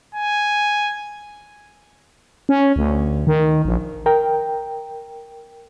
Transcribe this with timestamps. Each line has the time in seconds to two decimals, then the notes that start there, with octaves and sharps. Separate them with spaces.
0.15 G#5
2.49 C#4
2.76 D2
3.27 D#3
3.65 A#1
4.06 A#4 G5